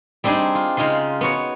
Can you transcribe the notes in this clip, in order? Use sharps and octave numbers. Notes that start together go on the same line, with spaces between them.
G3 C4 D4 D#4 G#4
F4
C#3 G#3 D#4 F4 C6
B3 F#4 C#5